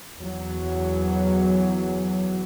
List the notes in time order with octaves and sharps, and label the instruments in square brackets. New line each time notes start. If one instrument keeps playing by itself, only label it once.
[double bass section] E2 F#3